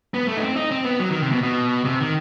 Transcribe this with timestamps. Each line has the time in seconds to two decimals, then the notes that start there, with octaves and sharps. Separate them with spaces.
0.14 B3
0.28 A3
0.37 D#4
0.43 C4
0.56 D#4
0.71 C4
0.85 B3
1.00 F#3
1.11 D#3
1.21 C3
1.32 B2
1.43 B2
1.85 C3
2.00 D#3